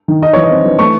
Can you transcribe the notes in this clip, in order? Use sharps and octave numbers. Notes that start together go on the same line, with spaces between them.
D#3
D#4 D#5
E3 C#5
D#5
C4
E3
A3 C#6